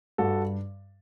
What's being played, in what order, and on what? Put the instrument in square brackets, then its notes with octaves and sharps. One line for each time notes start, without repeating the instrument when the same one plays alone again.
[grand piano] G2 F#4 A4